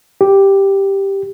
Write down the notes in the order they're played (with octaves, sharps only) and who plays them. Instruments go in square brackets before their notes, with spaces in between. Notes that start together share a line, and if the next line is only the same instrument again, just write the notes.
[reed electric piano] G4